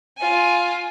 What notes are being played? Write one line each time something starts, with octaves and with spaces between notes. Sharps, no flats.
F4 G#5